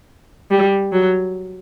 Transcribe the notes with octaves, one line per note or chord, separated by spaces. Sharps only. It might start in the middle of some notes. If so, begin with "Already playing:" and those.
G3
F#3